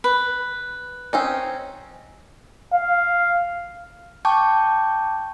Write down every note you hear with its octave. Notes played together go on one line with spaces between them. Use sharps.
B4
C4 C#4 D#4
F5
G5 A5 C#6 D6 G6